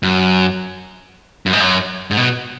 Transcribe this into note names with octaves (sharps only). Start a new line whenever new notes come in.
F#2
F#2
G#2
F#2
G#2
B2